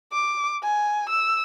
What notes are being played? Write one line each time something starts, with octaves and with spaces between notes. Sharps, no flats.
D6
G#5
E6